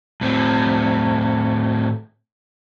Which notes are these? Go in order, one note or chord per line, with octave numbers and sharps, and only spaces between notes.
A2 C4